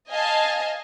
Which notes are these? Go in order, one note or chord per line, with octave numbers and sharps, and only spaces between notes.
D#5 F5 G#5 A5